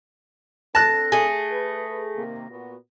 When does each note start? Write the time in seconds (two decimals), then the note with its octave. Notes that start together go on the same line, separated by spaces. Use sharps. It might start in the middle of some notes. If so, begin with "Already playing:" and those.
0.75 C4 D4 A4 A5 F#6 A#6
1.12 A3 G#4
1.51 B4
2.16 C3 D#3 A#3
2.50 A#2 B3 F#4